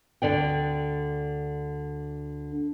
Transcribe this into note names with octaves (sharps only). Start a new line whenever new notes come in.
D2 G2 D3 D5 G5